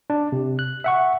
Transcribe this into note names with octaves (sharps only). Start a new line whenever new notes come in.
D4
C3
F#6
E5 F#5 C#6